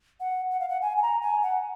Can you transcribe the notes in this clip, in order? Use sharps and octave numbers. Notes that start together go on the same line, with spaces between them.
F#5
F#5
F5
F#5
G#5
G#5
A#5
G#5
F#5